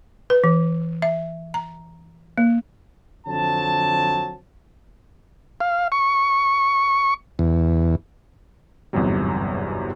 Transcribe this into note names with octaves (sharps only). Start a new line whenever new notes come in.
B4
E3
E5
A#5
A#3
F2 D3 F#3 C5 A5
F5
C#6
E2
G1 E2 G#2 C3 F#3 G3